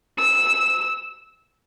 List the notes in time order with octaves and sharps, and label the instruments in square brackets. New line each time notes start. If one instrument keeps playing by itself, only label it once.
[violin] E6